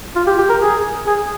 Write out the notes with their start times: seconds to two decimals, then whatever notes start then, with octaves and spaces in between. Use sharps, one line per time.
0.16 F4
0.27 G4
0.38 G4
0.49 A#4
0.61 G#4
1.07 G#4